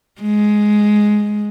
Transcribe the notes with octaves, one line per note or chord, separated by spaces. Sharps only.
G#3